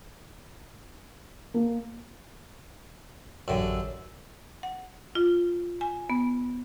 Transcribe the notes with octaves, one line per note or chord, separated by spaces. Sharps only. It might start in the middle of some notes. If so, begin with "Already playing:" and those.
A#3
A1 F#2 D3 G4 E6
F#5
F4
G#5
B3